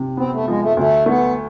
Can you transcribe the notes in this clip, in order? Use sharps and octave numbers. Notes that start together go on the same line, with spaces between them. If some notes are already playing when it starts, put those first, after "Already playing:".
Already playing: C3
B3 C4
A3
F3 G#3
A3
D2 A3
A3 B3